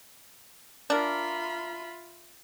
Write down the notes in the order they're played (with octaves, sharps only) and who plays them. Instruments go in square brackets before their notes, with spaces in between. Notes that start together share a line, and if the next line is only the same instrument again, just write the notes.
[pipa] D4 A#4 [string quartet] F4 E5 B5